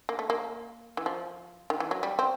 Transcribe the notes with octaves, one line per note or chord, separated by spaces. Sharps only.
A#3
A3
A#3
E3
F3
D#3
E3
F#3
G3
C4